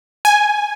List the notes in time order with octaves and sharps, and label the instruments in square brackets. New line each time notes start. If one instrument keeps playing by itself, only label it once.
[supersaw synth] G#5